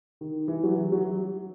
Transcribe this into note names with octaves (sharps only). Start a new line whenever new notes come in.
D#3
E3
F#3
E3
F#3